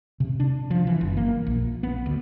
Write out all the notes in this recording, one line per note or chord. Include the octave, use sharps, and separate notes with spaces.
C3
D4
F3
E3
F#1
A#3
A#1
B3
D2